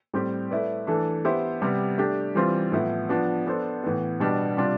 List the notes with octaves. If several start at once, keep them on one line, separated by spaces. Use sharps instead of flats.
A2 G3 C4 G4
A3 E4 B4 D5
E3 A3 D4 A4
B3 E4 G4 C5
C3 G3 B3
A3 D4 G4
E3 G3 C4 F4
A2 F3 B3 E4
F3 B3 D4
B3 D4 A4 C5
A2 E3 B3
B2 G3 B3 D4 G4
C3 G3 D4 F4